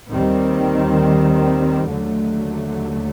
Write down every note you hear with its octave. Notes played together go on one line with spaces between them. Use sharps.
D#2 D#3 G3 C4
D#2 D3 F#3 A3